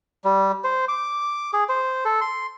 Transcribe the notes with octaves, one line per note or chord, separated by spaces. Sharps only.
G3
C5
D6
G#4
C5
A4
C6